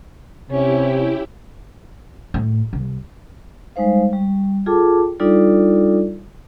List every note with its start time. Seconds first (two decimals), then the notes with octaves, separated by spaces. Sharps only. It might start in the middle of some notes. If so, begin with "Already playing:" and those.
0.50 C3 C#4 E4 G4
2.34 A2
2.73 C2
3.76 G3 G#3 D#4 C5 F5
4.13 G3
4.66 F4 G#4 A4 G5 A5 D6
5.20 G3 D4 D#4 F4 A4 D5